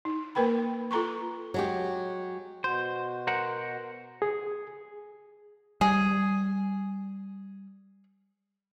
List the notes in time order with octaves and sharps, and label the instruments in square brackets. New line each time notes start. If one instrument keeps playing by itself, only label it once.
[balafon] D#4
A#3 A#4 B4 G5 B5
F4 A4 A#5 C6 C#6
[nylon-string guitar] F#3 G#3 G4
[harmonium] B2 F#4 [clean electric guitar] C5
[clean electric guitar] A#4 C5 F#5
[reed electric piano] G#4
[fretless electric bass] G3 [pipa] G#4